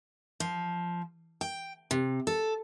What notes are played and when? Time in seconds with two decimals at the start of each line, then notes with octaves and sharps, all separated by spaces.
0.40 F3
1.41 G5
1.91 C3
2.27 A4